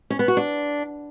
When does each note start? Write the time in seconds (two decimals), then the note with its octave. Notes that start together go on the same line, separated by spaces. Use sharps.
0.10 C#4
0.19 B3
0.28 F#4
0.37 D4